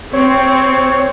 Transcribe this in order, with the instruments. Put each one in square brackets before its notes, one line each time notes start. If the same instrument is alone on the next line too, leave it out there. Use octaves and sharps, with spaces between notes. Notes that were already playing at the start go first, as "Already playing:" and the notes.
[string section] C4 [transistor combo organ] C#5